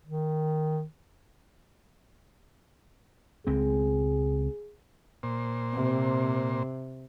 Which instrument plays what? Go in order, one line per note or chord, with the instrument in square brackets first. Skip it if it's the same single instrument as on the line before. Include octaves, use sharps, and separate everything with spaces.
[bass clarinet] D#3
[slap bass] C#2 G#3 C4 [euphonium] G#4
[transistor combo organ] A#2 C5
[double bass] C3